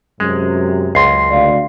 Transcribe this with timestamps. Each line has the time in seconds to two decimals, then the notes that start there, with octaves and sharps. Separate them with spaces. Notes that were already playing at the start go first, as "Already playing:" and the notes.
0.20 F#2 C3 G#3
0.95 C#2 C6 C7
1.31 D2 D5 F5